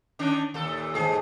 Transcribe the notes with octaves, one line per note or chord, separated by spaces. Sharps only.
D#3 C#4 D4
D#2 A#2 A4
D#2 G#2 G#4 A4